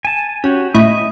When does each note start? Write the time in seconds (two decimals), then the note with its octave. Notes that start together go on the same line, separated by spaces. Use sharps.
0.05 G#5 A5
0.44 C#4 F#4 G4
0.74 A2 E4 D#5